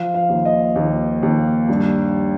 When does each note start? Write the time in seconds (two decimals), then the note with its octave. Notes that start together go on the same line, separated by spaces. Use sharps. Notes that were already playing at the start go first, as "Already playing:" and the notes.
Already playing: F3 F5
0.14 F5
0.29 D#2
0.45 D#5
0.76 D#2
1.23 D#2
1.69 G2